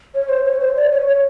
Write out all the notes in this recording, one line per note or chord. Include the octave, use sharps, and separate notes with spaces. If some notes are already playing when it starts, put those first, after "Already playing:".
C#5
C5
C#5
C5
D5
C#5
C#5